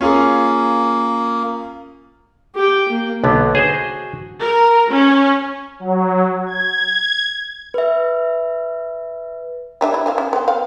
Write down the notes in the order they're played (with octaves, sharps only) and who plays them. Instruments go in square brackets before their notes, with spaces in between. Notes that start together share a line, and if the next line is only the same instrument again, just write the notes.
[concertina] A#3 [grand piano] C#4 F4 G#4
[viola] G4 G5
A#3
[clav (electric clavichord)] B1 D3 B3 [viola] F#4
[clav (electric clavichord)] G#4 C5 D#5
[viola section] A#4
C#4
[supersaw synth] F#3
G#6
[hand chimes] B4 E5
[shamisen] G3 D4 E5
E4
C4 E5 F5
C#4
B3 C4
B3 C4 F5